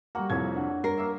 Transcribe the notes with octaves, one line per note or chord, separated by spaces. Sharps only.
G3 A#3 F#4 F#5
C2 F2 C#5 G#6
D4 F#5
G2 A#4 C7
A#3 E5